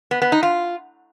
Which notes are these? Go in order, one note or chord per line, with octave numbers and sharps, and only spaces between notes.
B3
B3
D#4
F4